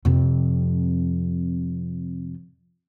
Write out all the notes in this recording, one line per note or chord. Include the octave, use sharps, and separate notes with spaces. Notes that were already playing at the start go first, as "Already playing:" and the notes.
F2 C3